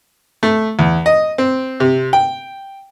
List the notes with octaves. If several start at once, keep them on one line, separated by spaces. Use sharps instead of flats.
A3
E2
D#5
C4
C3
G5